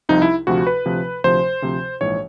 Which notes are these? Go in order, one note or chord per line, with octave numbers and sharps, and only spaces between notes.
C2 C3 F3 D#4
E4
D2 C3 F3 F#4
B4
D2 C3 F3
D2 C3 F3 C5
D2 C3 F3
A#1 G#2 E3 C#5